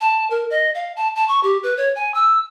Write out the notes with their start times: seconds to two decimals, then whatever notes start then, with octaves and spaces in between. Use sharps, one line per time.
0.01 A5
0.30 A#4
0.50 D#5
0.75 F5
0.96 A5
1.16 A5
1.28 C#6
1.43 G4
1.63 B4
1.77 C#5
1.96 G#5
2.14 E6